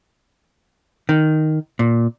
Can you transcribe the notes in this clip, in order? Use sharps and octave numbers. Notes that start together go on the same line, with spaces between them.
D#3
A#2